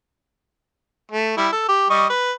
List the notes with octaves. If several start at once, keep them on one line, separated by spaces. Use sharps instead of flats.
A3
G3 E4
A4
G4
G3 D#5 C#6
B4